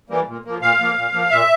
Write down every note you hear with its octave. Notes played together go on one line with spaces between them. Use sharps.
E3 G3 A#3
A#2
F3 A#3
A#2 F5
F3 A#3
A#2
F3 A#3
A#2 E5